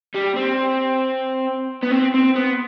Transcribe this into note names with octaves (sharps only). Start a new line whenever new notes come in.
G3
C4
B3
C4
C4
B3